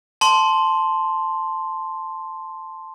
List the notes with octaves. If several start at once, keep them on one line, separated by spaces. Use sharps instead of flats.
A5 C6